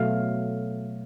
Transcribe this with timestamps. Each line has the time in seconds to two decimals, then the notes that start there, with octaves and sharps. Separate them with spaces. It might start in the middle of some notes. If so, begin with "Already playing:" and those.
Already playing: B2 F#3 A3 F5